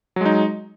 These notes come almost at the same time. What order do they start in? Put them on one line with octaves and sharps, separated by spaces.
F#3 G#3 D#4